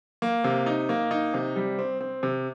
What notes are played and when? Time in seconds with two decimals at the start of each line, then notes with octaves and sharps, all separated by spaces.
0.22 A#3
0.44 C3
0.66 D#4
0.89 A#3
1.11 D#4
1.34 C3
1.56 G3
1.79 C4
2.01 C4
2.23 C3